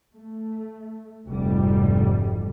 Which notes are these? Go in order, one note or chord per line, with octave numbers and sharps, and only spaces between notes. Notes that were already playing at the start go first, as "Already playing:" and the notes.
A3
F1 D2 G#2 G3